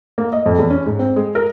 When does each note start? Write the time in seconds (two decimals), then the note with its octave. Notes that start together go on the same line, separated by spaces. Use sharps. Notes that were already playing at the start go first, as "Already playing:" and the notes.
0.18 A#3
0.33 D#5
0.46 F2
0.59 E2
0.70 C#4
0.86 G#2
0.99 C4
1.16 G#3
1.35 A#4